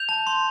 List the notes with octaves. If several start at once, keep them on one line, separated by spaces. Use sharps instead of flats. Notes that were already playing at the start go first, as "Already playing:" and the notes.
Already playing: G6 F7
A5
C6